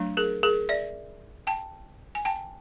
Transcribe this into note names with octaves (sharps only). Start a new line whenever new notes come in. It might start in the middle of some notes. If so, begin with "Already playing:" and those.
Already playing: F#3 A3 D4
G#4 A#4
G#4 A#4
D5 E5
G5 A5
G#5
G5 A5